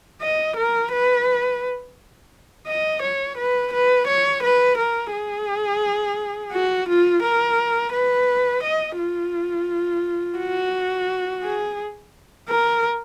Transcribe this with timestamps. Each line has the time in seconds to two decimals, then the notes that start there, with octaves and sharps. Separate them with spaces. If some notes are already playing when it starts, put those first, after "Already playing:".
0.22 D#5
0.57 A#4
0.93 B4
2.68 D#5
3.03 C#5
3.38 B4
3.73 B4
4.07 C#5
4.43 B4
4.78 A#4
5.13 G#4
6.53 F#4
6.88 F4
7.23 A#4
7.93 B4
8.63 D#5
8.99 F4
10.38 F#4
11.43 G#4
12.49 A#4